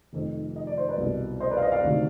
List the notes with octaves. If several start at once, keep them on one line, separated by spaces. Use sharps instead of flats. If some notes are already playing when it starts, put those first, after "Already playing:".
F1 F2 D#3
D#5
D5
C5
B4 D5
C2 B2
C5 D#5
B4 D5
F5
C5 D#5
D5 F5
D2 C3 D#3